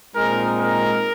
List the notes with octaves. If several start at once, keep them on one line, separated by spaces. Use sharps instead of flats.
A#2 G#3 C4 D#4 A#4
A#4